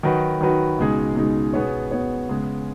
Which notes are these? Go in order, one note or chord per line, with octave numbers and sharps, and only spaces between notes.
D#3 F#3 D#4 F#4 B4
D#3 F#3 D#4 F#4 B4
C#2 B2 G#3 D#4 G#4
C#2 B2 G#3 D#4 G#4
B2 B3 G#4 C#5
B2 B3 G#4 C#5
C#3 G#3 B3 G#4